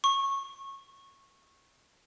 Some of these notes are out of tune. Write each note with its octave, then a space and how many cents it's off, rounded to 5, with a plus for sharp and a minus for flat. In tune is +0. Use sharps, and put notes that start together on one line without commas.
C#6 -15